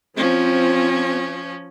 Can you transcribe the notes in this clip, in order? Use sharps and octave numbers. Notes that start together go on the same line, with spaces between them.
F3 C4 C#4 F4